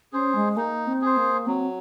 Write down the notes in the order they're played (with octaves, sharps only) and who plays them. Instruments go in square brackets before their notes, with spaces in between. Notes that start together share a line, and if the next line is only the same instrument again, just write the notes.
[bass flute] C#4 [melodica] G#4 C5
[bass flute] G#3
[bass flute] A#3 [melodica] D#4
[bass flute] C4
[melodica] G#4 C5
[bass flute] A#3
[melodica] F#3 [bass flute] C4